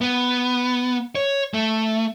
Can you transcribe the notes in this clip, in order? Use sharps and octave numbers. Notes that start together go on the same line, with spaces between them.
B3
C#5
A3